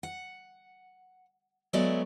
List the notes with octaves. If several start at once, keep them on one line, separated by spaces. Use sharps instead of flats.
F#5
F#3 G#3 A3 B3 F#4 D5